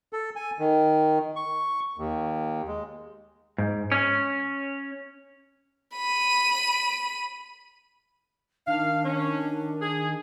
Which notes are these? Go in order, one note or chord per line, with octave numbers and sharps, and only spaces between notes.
A4
G#5
D#3
C#6
D#2
G#3
G#2
C#4
B5 D#7
D#3 D4 F5
C#4
G#4